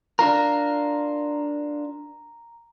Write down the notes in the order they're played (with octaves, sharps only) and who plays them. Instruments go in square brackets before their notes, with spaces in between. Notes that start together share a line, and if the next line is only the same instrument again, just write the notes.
[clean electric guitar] D4 F4 A#4 [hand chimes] A#5